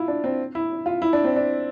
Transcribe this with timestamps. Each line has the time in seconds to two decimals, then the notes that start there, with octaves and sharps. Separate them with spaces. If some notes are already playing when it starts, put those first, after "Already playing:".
Already playing: E4 F4
0.08 D4
0.24 C4
0.55 E4
0.86 F4
1.02 E4
1.13 D4
1.24 C4
1.36 D4